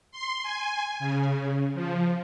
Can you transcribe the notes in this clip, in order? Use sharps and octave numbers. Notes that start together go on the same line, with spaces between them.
C6
G#5
C#3
F3